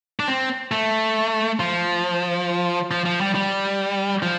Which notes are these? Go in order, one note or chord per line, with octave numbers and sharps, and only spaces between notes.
D4
C4
A3
F3
F3
F3
G3
G3
F3